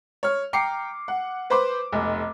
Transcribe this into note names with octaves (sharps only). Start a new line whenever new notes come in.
C#5 F6
G5 A#5 D6 C7 C#7
F#5
B4 C5 B5 C6 D6
F1 B1